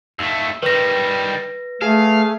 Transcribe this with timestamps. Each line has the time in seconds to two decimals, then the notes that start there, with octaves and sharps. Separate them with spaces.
0.19 D#2 A3 E6
0.63 D#3 G3 B4 A#6
1.82 A3 G#4 F5